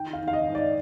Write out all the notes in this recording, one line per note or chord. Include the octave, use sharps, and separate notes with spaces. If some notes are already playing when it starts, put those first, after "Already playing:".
Already playing: D#3 G5
F5
D#3
F5
D#5
G#2
D5